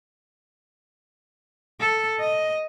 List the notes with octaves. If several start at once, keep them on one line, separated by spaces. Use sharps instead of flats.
A4
D#5